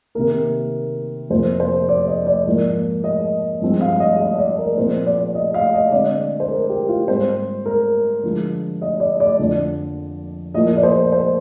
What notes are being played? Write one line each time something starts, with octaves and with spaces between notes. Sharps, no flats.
C3 D#3 A#3 A#4
F2 C3 F3 A#3 C5
C5
D5
D#5
D5
G#2 F3 A#3
D#5
G2 F3 G#3 C4
F5
D#5
D#5
D5
A#4
A#2 F3 C4 C5
D5
D#5
F5
D#5
D3 G#3 C4 D5
C5
A#4
G4
F4
G#2 G3 C4 C5
A#4
D3 F3 G#3
D#5
D5
D5
F2 D3 F3
A#2 F3 A#3 D#5
D5
C5
C5